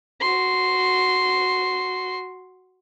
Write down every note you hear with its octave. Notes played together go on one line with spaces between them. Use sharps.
F#4 C6